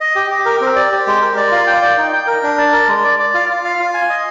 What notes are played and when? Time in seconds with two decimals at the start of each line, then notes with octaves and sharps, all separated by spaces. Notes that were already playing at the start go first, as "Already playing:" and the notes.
0.01 D#5
0.15 G4
0.31 G4
0.45 A#4
0.61 C4
0.76 D5
0.92 G4
1.07 G#3
1.22 A#4
1.37 D5
1.51 F4
1.67 G5
1.82 D5
1.98 D#4
2.13 G5
2.27 A#4
2.43 D4
2.58 D5
2.73 A#4
2.88 G#3
3.04 D5
3.19 D5
3.34 F4
3.49 F4
3.64 F5
3.79 F4
3.94 G#5
4.10 D#5